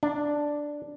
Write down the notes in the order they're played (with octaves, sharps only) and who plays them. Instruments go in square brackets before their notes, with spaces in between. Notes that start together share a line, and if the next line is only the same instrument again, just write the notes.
[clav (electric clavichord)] D4